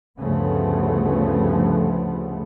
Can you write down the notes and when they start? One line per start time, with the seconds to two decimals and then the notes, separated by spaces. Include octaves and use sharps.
0.19 D2 G2 C#3 F3 A3 B3